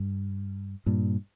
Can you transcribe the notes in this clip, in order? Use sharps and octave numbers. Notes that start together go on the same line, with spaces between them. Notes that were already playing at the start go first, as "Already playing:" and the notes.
Already playing: G2
G2 A#2